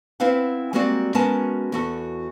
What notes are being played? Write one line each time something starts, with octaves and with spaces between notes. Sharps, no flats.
C4 E4 B4 F5 F#5
G3 G#3 A#3 C4 F#4 D5
G#3 B3 C#4 F#4 A#4 A5
E2 F#4 A4